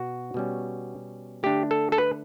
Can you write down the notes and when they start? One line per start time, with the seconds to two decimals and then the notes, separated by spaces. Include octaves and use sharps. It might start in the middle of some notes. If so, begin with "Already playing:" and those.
Already playing: B2 F#4
0.34 B2 G3 C#4
1.43 D3 A3 D4 G4
1.71 A4
1.92 A4
1.98 B4